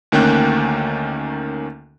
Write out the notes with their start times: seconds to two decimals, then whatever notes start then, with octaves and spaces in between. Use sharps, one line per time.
0.12 D2 D#3 A#3 C#4 G5 F#6